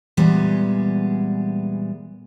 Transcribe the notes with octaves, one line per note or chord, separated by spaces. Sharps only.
A#2 E3 G3 G#3 B3